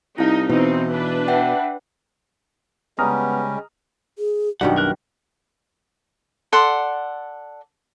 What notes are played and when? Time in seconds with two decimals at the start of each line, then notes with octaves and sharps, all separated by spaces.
0.18 C2 D#4 E4 F5
0.49 B2 E3 C4 D#4
0.91 D4 B4
1.28 E5 F#5 G5
2.99 C#3 G3 G#3 B3 C#4 A#5 D#6 F6
4.18 G#4
4.61 B1 F#2 B2 D#3 G3 D4 F#5
4.77 A#4 F#6
6.52 A4 D5 F#5 C6